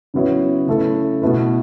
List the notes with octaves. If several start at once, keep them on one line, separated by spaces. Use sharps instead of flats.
C#3 F#3 B3 E4 C#5
C#3 A3 E4 A4
B2 A3 E4 B4